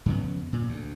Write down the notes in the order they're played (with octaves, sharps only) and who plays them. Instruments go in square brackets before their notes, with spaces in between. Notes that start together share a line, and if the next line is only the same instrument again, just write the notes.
[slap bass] F2 C#3 B3
A#2
D2